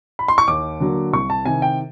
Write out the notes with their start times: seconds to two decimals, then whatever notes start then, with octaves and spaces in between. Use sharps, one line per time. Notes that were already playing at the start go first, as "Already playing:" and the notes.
0.19 B5
0.28 C6
0.38 C#6
0.48 D#2 D6
0.80 D3 F#3 A#3
1.12 C2 C#6
1.30 A5
1.45 C3 D#3 G#5
1.62 G5